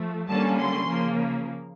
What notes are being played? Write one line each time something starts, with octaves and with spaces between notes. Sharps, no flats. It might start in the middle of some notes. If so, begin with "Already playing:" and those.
Already playing: F3 A3
D3 G3 A#3 C#4 A5
C6
C#3 F3 A#3